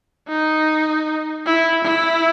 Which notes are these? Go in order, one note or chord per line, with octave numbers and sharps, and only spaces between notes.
D#4
E4
E4